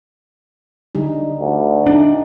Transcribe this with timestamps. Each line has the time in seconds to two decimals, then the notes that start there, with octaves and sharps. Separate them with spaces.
0.95 D3 G3 D#4
1.40 D2
1.86 D4 D#4